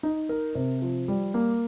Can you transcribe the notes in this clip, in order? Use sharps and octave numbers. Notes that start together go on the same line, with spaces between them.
D#4
A#4
C3
F3
G3
A#3